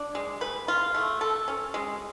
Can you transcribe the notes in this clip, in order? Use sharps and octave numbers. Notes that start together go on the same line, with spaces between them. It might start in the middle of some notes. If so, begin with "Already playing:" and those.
Already playing: D4
G#3
B4
F4
A3
A4
C#4
G#3